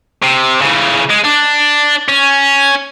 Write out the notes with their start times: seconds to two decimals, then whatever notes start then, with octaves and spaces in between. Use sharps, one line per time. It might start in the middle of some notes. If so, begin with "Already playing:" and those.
0.23 C3
0.62 C#3 E3
1.10 G#3
1.25 D4
2.09 C#4